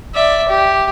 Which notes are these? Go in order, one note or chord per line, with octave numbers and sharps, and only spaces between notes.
D5 E5
G4